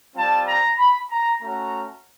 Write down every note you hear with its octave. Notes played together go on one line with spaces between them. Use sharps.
G3 C4 F4 A5
A#5
B5
A#5
A3 C#4 F#4 A#5